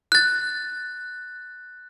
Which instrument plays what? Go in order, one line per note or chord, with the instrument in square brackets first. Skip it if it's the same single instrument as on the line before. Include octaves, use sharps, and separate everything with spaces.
[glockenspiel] F#6 A6